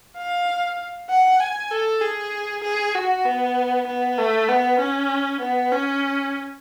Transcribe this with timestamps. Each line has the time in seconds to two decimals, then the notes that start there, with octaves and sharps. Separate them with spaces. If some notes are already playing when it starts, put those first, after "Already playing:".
0.17 F5
1.10 F#5
1.40 G#5
1.71 A4
2.01 G#4
2.64 G#4
2.95 F#4
3.25 B3
3.87 B3
4.18 A3
4.49 B3
4.80 C#4
5.41 B3
5.72 C#4